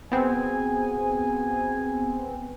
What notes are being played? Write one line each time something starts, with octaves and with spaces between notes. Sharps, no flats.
B3 C4 F#4 G#4 G#5